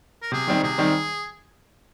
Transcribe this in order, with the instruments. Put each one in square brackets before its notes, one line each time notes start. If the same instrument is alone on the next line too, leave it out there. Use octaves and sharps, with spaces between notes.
[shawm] A#4
[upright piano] C3 [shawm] G#4
[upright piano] D#3 G3 C4 D#4
[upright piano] C3 [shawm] G#4
[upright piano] D#3 G3 C4 D#4